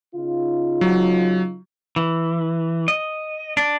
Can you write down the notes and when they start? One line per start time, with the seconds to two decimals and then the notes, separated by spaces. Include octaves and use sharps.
0.15 C#3 D#4 F4
0.81 F#3
1.96 E3
2.88 D#5
3.57 D4